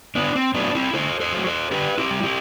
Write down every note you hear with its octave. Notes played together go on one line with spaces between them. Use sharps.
D3 B3 D4
C4
F#3 A3 B3 D4
C4 E4
D3 A4 C5
A4 C5
F#3 A3
A4 C5
D3 G4 B4
E4 G4
G3
E4 G4